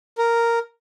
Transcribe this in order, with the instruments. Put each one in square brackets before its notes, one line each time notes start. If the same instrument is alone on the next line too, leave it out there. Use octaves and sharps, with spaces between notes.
[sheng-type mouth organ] A#4